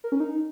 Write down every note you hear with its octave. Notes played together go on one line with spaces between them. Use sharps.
A#4
C#4
D#4